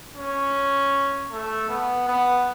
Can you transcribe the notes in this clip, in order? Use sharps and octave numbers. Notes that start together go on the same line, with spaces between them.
C#4
A3
B3
B3